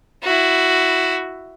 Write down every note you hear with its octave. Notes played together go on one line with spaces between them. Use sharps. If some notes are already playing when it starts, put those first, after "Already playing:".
E4 F#4